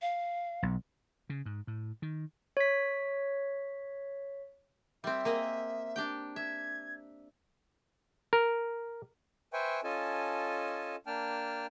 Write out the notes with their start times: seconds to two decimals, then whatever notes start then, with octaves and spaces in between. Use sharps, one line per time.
0.02 F5
0.63 B1
1.30 C#3
1.46 G#2
1.67 A2
2.02 D#3
2.57 C#5 B6
5.04 G3 C4 E5
5.25 A#3 G#4 D#5
5.96 D4 G4 G5
6.36 E5 G#6
8.33 A#4
9.53 B4 C5 E5 G5 G#5 C#6
9.84 C#4 F4 A4 D#5 G#5 A5
11.07 A#3 D4 G5 A5 F6